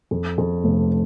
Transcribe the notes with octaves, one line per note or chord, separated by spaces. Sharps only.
F2
F2
F1